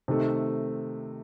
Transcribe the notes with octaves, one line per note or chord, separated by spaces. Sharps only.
C3 D#3 A3